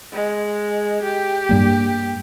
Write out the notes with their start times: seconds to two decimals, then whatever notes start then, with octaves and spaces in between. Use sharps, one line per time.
0.13 G#3
1.03 G4
1.49 G2 G3 A#3